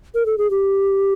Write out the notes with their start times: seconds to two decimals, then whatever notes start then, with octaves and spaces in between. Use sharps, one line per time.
0.15 A#4
0.26 A4
0.38 G#4
0.51 G4